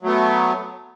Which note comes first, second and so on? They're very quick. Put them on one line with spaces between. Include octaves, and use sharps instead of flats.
F#3 A3 B3